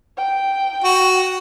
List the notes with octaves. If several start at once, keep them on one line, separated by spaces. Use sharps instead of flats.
G5
F#4